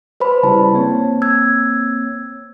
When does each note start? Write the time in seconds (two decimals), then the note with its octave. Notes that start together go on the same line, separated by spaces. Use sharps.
0.20 B4 C5 B5
0.43 C#3 G3 E4 A5
0.74 A#3 C4 C#5
1.22 E6 G#6